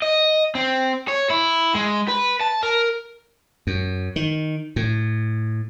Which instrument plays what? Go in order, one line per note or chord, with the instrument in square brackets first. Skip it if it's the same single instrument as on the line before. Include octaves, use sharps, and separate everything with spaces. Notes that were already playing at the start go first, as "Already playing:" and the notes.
[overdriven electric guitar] D#5
C4
C#5
E4
G#3
B4
A5
A#4
[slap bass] F#2
D#3
A2